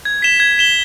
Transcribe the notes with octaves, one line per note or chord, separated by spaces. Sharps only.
G#6
B6 E7 G7
G#6
B6 E7 G7